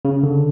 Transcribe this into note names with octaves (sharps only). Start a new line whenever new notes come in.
C#3
D3